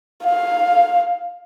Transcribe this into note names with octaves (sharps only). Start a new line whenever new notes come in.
F5